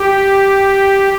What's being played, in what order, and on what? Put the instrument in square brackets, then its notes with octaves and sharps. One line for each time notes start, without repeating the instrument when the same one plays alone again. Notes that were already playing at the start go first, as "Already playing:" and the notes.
Already playing: [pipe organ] G4